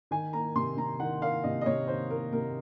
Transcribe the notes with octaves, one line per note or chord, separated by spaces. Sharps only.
D#3 G#5
A#3 A#5
C3 C6
C3 A#5
D#3 F#5
A#3 F5
C3 D#5
D#5
C3 C#5
D#3 C5
A#3 A#4
C3 A#4